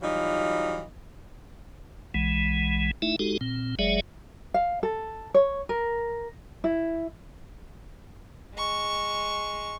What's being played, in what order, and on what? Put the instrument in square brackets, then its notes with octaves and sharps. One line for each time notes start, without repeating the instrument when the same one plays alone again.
[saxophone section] E3 F#3 G3 D#4 F4
[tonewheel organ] B1 E3 G#3
A3 D#4 E4 E5
G#3 D#4 F#4 G4 A4
A#2 C4
F#1 F#3 G#3 G#4 D5 E5
[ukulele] F5
A4
C#5
A#4
E4
[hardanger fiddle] G#3 C#6